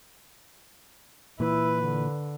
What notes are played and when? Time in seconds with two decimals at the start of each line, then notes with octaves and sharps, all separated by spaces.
1.40 A#2 E3 E4 B4
1.82 D3